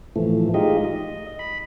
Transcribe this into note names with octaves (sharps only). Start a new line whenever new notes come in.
A2 E3 F3 A3
G#3 D#4 F4 G4 D#5
D#5
B5